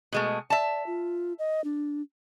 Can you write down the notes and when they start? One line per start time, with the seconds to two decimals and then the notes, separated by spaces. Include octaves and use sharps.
0.12 B2 G#3 A3
0.50 D5 E5 A5
0.87 F4
1.39 D#5
1.64 D4